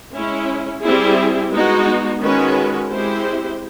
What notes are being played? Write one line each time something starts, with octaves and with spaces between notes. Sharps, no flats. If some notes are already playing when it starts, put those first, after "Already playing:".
G#3 C#4 E4
G3 C4 E4 G#4
G#3 B3 D#4 F#4
D#3 G#3 C#4 F#4 B4
G#3 C4 E4 G4 C5